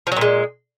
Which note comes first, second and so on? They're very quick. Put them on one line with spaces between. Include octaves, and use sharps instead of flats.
F3 F#3 A#2 G#3